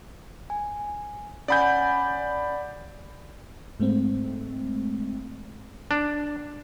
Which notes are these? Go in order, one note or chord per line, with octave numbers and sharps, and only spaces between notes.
G#5
C#4 D5 F#5 G#5 B5 G6
G#2 G#3 A3 C4
D4